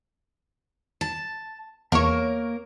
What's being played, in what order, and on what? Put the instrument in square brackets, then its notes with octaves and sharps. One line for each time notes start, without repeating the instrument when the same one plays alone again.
[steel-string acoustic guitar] A5
[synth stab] E2 C#5 [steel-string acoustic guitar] A#3 A#4